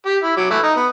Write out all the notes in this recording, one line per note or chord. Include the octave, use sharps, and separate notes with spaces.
G4
E4
F#3 D6
E3 A3 E4
D#4
B3